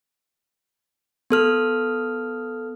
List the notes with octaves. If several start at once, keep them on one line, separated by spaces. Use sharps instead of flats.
B3 A4 F6